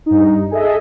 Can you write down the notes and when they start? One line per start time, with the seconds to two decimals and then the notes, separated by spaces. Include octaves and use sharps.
0.06 G2 D#4
0.51 G#4 A4 D#5 E5